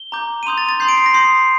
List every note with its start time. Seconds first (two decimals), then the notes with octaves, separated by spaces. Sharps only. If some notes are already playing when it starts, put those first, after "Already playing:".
Already playing: G7
0.12 A#5 D6 G6
0.43 D#7
0.46 C6 D#6 G6 F7
0.58 A6
0.69 A6
0.80 C6 D#6 G6 C7
0.88 D7
0.97 C7
1.06 A#6
1.14 C6 D#6 G6 C7